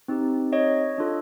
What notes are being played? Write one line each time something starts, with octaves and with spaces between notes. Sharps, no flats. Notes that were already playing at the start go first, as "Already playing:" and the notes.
C4 D#4 G4
C#5 D#5
D4 F4 A4